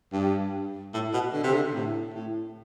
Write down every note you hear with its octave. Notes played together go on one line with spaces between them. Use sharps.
G2
A2
B2
D3
C3
D3
A2
A2